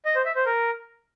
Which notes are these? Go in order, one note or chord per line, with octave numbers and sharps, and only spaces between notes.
D#5
C5
E5
C5
A#4